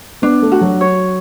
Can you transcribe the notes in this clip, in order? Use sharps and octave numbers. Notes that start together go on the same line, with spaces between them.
B3 D4
A3
F#4
F#3
C#5